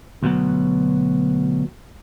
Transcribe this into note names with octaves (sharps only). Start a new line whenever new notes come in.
D2 B2 F#3